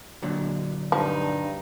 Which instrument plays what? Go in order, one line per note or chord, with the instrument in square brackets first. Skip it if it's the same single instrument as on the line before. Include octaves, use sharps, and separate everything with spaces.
[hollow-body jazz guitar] A#2 D3 F#3
[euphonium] G2 [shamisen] F3 [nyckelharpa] D#4